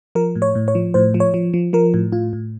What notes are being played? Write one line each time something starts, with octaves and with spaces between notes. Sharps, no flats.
F3 A#4
A2
C#5
A2
C#5
F3
A2 C5
F3
C#5
F3
F3
F3 A#4
A2
A2 F4
A2